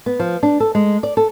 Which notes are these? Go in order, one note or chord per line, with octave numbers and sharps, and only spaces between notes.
B3
F3
D4
A4
G#3
D5
A4